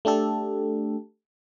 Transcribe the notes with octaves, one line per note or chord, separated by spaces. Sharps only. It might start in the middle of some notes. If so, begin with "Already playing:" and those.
A3 D4 G4 A4